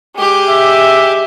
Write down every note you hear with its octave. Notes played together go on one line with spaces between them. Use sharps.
G#3 G4
E5